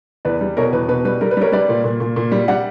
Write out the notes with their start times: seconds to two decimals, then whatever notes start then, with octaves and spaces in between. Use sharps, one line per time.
0.25 E2 B4 D5
0.41 G3
0.57 B2 A#4 C#5
0.72 E2 B4
0.88 B2 B4
1.05 G3 B4
1.21 G3 A#4
1.31 B4
1.37 G3 A#4 C#5
1.52 G3 B4 D5
1.69 A#2
1.84 A#2
2.00 A#2
2.16 A#2
2.32 G3
2.48 G3 D5 F#5